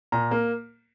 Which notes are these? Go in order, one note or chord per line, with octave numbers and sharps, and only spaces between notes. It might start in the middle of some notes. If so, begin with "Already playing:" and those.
A#2 A#5
A#3